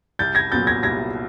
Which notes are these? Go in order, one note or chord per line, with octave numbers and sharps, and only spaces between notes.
C2 G6 A6
G#6 A#6
A#2 F#3 B3 G6 A6
G#6 A#6
C2 G#6 A#6